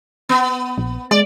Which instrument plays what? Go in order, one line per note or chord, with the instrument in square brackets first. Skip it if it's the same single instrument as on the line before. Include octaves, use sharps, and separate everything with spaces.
[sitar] B3
[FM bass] A#1
[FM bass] G#3 [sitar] D5